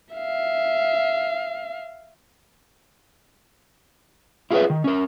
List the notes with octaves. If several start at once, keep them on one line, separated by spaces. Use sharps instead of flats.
E5 F5
E4 F4 G#4 A#4 B4 E5
D#3
C#4 A#4